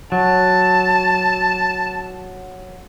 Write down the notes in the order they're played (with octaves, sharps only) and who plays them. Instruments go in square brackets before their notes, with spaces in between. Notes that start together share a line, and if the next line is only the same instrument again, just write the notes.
[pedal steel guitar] F#3 [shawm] A5